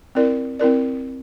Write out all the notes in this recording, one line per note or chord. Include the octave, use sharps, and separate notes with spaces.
C4 E4 A#4 D5
C4 E4 A#4 D5